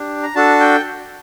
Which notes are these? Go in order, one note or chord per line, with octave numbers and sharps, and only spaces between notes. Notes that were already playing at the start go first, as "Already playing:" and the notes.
Already playing: D4 G4
A#5
D4 F#4 A4 A5
G5